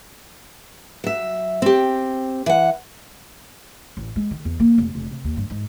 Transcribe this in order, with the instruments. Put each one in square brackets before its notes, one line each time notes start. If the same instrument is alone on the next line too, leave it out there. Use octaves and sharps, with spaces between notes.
[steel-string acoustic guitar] F#3 E5
C4 G4
E3 F#5
[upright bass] A1
G#3
D#3
E2
A#3
F1
F1
C3
D#2
G2
G#2